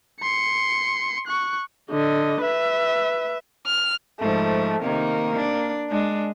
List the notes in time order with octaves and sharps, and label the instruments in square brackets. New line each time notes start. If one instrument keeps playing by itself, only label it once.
[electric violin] C6 C#7
C#6 F#6
[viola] D3 D#5
B4 E5
[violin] F6
[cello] G#2 F3 [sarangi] A3
[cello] C3 D#3 [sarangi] A#3
[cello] D4
[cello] G#3 [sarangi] D4